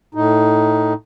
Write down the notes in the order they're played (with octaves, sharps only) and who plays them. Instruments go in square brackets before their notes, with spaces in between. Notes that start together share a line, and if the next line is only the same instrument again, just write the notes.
[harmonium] A2 D#4